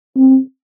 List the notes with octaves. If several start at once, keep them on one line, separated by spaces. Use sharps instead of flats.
C4